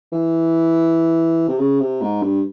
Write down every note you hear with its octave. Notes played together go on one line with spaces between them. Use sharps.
E3
C3
C#3
C3
G#2
G2